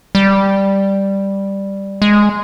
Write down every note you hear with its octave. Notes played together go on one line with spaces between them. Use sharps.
G3
G#3